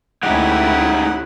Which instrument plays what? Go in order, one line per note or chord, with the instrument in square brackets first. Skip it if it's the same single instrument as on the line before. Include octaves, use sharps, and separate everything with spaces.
[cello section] D2 C#4 E4 [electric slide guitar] G#3 D#4 G4 [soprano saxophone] F#5